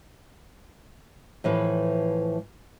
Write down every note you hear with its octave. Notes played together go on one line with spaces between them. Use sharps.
A2 E3 F3 B4